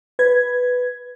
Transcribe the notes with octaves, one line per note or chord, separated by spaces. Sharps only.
B4 G#6